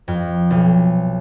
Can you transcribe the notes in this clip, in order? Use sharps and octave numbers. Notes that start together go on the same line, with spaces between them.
F2
B1